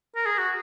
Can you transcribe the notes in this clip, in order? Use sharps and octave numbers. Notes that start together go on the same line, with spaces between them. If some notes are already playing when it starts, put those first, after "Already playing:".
A#4
G#4
F#4